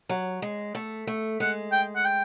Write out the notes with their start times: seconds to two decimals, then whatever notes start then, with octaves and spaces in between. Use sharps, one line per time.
0.09 F#3
0.42 G#3
0.75 A3
1.07 A3
1.40 G#3 F#5
1.72 G5
1.96 F#5
2.05 G5